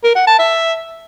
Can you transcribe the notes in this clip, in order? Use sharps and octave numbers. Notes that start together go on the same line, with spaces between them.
A#4
F#5
A5
E5